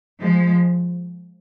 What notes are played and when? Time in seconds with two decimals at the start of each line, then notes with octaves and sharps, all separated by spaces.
0.20 F3 G#3